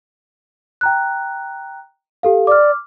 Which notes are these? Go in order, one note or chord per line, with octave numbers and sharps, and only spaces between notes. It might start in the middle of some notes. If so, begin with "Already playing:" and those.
G5 A#5 F#6
G4 A4 F5
D5 D6 F6